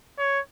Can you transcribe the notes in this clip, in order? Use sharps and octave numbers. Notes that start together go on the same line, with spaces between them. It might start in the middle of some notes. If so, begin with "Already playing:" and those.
C#5